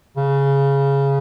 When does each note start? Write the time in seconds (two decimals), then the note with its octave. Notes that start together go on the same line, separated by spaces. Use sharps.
0.17 C#3